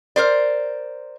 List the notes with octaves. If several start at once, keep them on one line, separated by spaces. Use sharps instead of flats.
A#4 C5 D5